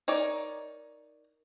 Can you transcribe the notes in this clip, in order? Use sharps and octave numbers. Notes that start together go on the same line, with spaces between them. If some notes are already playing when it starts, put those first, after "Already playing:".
D#4 A#4 C#5 D5